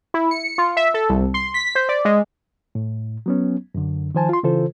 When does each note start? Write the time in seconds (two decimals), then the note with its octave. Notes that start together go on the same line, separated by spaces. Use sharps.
0.14 E4
0.31 C#7
0.58 F4
0.77 E5
0.94 A4
1.09 C2
1.34 C6
1.54 B6
1.75 C5
1.89 D5
2.05 G#3
2.75 A2
3.26 F#3 B3 C#4
3.75 F#2 D3
4.15 D#3 F3 C5 G#5 A5
4.29 F4 C6
4.43 C#3 E3 F4 A4 C5